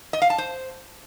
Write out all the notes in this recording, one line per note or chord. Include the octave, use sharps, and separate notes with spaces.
D#5
F5
A5
C5